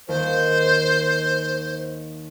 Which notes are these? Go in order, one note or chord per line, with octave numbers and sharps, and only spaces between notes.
D#2 C5